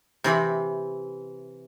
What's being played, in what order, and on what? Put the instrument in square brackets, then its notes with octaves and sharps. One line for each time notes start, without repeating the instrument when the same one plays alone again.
[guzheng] C3 E3 C4 B5